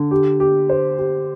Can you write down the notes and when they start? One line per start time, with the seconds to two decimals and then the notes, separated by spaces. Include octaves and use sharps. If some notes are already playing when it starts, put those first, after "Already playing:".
Already playing: D3
0.11 G4
0.40 G4
0.69 C5
0.98 G4